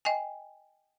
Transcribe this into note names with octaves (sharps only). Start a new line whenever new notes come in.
D#5 G5 G#5